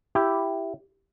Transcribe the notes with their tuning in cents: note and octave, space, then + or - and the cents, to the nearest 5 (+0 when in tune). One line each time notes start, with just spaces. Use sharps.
E4 +5 G4 +0